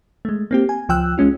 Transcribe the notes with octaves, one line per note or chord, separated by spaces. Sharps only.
G#3 A3
A#3 C4 G4
G#5
C#2 F3 G5 E6 F#6
G#3 C#4 F4